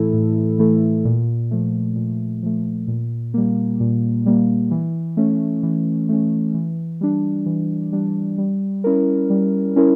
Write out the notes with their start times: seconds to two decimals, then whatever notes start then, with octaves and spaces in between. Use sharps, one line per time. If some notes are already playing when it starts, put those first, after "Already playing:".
Already playing: A2 E3 A3 E4 A4
0.13 A2
0.59 E3 A3 E4 A4
1.05 A#2
1.51 F3 A3
1.96 A#2
2.43 F3 A3
2.88 A#2
3.34 G3 A#3
3.80 A#2
4.26 G3 A#3
4.71 E3
5.17 A3 C#4
5.63 E3
6.09 A3 C#4
6.54 E3
7.01 G3 D4
7.46 E3
7.93 G3 D4
8.38 G3
8.84 C#4 E4 A#4
9.30 G3
9.76 C#4 E4 A#4